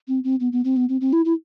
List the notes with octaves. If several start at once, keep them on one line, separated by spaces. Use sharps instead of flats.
C4
C4
B3
B3
C4
B3
C4
C4
E4
E4